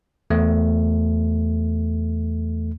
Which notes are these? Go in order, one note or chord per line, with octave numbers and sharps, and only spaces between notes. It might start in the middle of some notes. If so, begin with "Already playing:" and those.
E2 A3